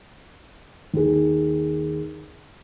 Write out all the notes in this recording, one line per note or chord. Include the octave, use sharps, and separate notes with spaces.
D#2 G#4